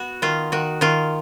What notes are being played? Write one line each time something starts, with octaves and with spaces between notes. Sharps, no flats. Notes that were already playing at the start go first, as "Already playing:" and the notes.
Already playing: B3 F#4
D#3 F4
D#3 F#4
D#3 F4